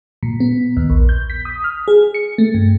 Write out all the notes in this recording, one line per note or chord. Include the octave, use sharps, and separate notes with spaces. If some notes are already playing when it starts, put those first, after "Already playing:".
A#2
B3
D#2
A#1
G6
B6
D#6
F6
G#4
C#7
A3
G2